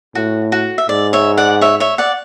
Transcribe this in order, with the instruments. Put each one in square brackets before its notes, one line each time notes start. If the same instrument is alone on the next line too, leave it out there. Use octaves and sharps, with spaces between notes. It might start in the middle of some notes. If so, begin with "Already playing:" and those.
[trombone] A2 [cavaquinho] F#4
[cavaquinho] F#4
E5
[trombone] G#2 [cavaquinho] D5
[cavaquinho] C#5 E5
D5 F#5
C#5 E5
C#5 E5
D5 F#5